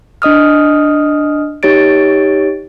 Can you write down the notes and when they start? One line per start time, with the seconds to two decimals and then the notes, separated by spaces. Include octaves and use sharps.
0.22 D4 D#5 D#6 F6
1.63 D#4 G4 C#5 A6 D7